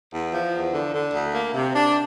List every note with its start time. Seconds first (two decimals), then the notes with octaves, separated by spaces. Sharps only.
0.14 E2
0.34 F3
0.54 E2
0.74 D3
0.95 D3
1.14 D2
1.34 A#3
1.55 C3
1.76 D4